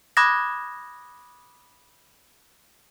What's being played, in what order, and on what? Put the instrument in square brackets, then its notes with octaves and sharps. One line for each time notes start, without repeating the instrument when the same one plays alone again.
[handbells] B5 D6 D#6 F#6 G#6 A#6